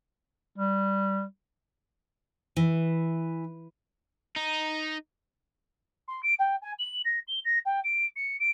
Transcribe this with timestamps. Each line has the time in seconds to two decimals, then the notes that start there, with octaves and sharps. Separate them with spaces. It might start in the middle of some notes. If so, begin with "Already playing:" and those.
0.58 G3
2.57 E3
4.36 D#4
6.08 C6
6.23 D7
6.39 G5
6.62 G#5
6.79 F#7
7.05 A#6
7.28 G7
7.45 A#6
7.65 G5
7.84 D7
8.16 C#7
8.40 D7